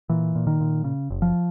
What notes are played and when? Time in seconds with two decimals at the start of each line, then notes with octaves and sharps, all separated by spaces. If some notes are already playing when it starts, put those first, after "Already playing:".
0.10 A#2 E3
0.35 A#2
0.47 D#3
0.60 A#2
0.84 C#3
1.11 F#1
1.22 F3